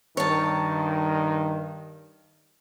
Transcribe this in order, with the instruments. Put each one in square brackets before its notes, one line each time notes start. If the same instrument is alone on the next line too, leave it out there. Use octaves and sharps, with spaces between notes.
[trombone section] G2 D#3 [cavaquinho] C#5 A5